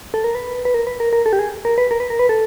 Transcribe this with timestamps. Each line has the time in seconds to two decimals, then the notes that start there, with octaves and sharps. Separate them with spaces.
0.14 A4
0.24 A#4
0.35 B4
0.65 B4
0.74 A#4
0.87 B4
1.00 A#4
1.13 A#4
1.26 A4
1.33 G4
1.39 G#4
1.65 A#4
1.78 B4
1.91 A#4
2.00 B4
2.10 A#4
2.19 B4
2.29 A4